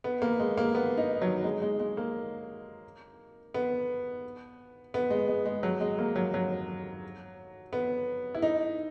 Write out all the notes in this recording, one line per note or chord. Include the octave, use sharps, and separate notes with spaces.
B3
A#3
G#3
A#3
B3
D#4
F#3
G#3
G#3
G#3
A#3
B3
B3
G#3
G#3
G#3
F#3
G#3
A#3
F#3
F#3
B3
E4
D#4